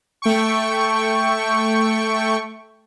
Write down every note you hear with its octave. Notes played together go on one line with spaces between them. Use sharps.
A3 G5 C#6